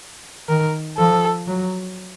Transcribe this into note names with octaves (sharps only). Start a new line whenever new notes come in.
D#3 A#4
F3 A4
F#3